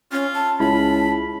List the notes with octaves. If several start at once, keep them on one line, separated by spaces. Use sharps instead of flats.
C#4 F4
A5
C#2 E4 B5